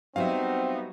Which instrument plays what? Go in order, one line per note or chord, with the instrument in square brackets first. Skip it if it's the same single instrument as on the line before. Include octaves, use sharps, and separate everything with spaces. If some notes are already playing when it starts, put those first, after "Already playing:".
[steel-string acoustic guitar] F#3 G3 F#4 [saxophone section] B3 D#4 [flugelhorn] C4 [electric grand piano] E5 F5